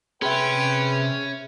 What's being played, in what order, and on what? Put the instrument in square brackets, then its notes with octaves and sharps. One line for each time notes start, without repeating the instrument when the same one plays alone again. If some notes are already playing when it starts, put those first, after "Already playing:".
[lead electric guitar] C3 C6 [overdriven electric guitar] C#4 [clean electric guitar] G#4 E5 [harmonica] B4 G5